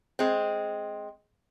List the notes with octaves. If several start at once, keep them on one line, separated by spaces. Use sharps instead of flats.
G#3 C4